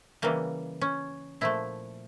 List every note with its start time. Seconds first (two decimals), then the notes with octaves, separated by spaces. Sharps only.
0.22 C#3 E3 G3 A#3
0.81 C#4
1.41 A#2 F3 A3 E4